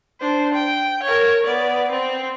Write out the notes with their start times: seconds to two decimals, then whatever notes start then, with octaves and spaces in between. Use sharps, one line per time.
0.20 D4 C5
0.54 G5
1.03 A#4 C#5
1.46 B3 D5
1.91 C4